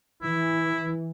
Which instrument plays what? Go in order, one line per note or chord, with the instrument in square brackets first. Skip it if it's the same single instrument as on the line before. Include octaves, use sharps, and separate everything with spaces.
[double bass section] E3 [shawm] E4